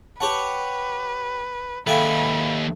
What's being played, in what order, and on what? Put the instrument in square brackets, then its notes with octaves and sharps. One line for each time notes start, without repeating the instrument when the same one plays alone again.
[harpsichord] G4 C#5 F#5 [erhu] B4 [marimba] A5
[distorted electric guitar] D#2 B4 [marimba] A4 F5 [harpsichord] E5 G5 G#5 [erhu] B5